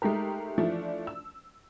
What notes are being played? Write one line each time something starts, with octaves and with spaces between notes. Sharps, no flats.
G#3 A3 D#4 G4 A#4
E3 F3 A3 D4 D5
E6